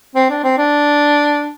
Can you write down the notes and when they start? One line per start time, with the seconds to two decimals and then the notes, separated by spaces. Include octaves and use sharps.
0.16 C4
0.30 D4
0.44 C4
0.58 D4